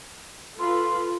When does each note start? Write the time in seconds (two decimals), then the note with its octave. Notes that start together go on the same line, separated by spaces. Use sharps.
0.59 F4 A4 B4 C6